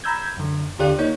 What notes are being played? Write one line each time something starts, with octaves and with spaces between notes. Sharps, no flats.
A#5 B5 E6 G6 G#6
F#2 D3
D#2 D3 F4 G4 D5 F#6
A#3 D#4 C#5 G6